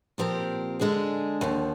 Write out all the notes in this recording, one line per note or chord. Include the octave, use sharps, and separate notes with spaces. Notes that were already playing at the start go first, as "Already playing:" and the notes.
A#2 F3 C4 G4 A#4
D3 G#3 D4 G#4
D#2 D3 F3